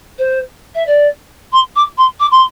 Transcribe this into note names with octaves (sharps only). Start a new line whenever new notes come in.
C5
E5
D5
C6
D6
C6
D6
C6